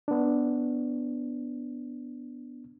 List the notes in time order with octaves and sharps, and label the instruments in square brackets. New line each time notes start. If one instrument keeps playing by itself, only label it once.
[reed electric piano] B3 D4